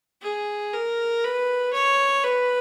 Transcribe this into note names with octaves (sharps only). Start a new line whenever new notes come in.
G#4
A#4
B4
C#5
B4